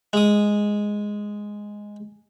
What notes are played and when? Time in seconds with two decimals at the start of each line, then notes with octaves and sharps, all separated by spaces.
0.13 G#3 D#6